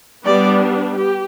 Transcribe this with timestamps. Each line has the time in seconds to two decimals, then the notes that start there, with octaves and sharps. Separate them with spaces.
0.25 G3 B3 D4 D5
0.97 G4